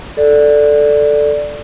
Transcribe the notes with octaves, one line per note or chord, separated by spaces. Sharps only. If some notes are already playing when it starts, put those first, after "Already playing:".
A4 D5